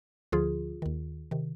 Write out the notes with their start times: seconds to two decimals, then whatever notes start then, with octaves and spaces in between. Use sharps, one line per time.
0.32 D2 D3 F3 F4 G#4
0.82 D#2 D#3
1.31 C3 D#3